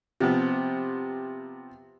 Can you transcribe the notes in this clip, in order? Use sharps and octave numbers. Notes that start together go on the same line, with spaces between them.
C3 F3 B3